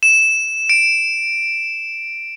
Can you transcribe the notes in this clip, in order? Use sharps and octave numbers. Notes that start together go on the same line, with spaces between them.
E7
D7